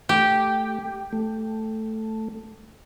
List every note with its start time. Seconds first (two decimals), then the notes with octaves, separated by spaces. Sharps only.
0.09 A3 G4
1.13 A3